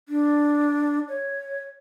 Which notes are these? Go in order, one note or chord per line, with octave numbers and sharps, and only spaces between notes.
D4
C#5